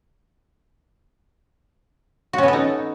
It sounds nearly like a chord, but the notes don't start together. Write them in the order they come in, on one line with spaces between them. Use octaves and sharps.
F#4 C#4 B3 A4 D#4